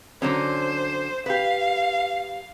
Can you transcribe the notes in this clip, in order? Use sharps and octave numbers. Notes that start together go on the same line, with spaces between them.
D3 F#3 C#4 C5
G4 B4 F5